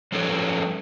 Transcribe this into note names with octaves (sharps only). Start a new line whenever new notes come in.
F3 G3 C#4 A4 B4 C#5